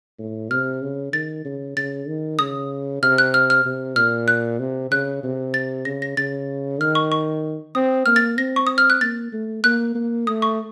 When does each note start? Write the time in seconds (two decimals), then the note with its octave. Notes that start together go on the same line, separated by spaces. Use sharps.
0.19 A2
0.50 C3 F6
0.82 C#3
1.13 D#3 A6
1.45 C#3
1.77 C#3 A6
2.08 D#3
2.39 C#3 D#6
3.02 C3 F6
3.18 F#6
3.34 F6
3.50 F6
3.65 C3
3.96 A#2 F6
4.28 F#6
4.59 C3
4.91 C#3 F#6
5.23 C3
5.54 A6
5.85 C#3 A#6
6.02 A#6
6.17 C#3 A6
6.80 D#3 F6
6.95 C#6
7.12 C#6
7.75 C4 D#6
8.06 A#3 F6
8.16 A6
8.37 C4 A#6
8.56 C#6
8.67 D#6
8.78 F6
8.90 F#6
9.01 A#3 A6
9.32 A3
9.64 A#3 F#6
9.95 A#3
10.27 A3 D#6
10.42 C#6